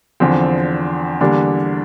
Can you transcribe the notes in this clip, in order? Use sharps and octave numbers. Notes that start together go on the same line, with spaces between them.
E2 D3 F3 C4
E2 D3 G3 A#3 D4